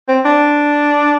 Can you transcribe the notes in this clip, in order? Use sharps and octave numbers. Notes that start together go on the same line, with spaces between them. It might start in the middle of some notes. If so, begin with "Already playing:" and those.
C4
D4